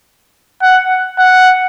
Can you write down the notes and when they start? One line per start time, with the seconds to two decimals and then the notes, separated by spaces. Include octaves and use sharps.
0.62 F#5
1.19 F#5